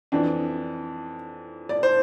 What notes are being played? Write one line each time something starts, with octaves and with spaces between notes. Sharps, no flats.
F2 E3 D4
D5
C5